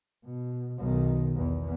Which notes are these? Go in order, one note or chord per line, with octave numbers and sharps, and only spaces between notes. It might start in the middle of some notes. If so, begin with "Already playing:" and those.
B2
B1 D#3
E2